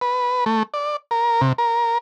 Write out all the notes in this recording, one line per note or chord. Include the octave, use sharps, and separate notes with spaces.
B4
A3
D5
A#4
C3
A#4